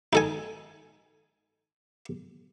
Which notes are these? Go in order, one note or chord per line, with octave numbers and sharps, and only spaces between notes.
D#4 A4 G#5